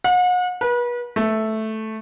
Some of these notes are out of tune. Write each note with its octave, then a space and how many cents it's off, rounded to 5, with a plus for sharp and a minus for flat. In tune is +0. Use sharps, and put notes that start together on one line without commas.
F#5 -40
B4 -35
A3 -5